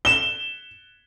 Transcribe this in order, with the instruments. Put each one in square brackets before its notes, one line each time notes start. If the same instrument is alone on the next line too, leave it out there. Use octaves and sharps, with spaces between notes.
[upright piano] E7 G7